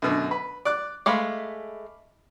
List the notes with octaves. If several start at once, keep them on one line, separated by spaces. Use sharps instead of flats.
F#2 B2 D3
B4
D5 D6 F#6
G#3 A3 F5 B5 D6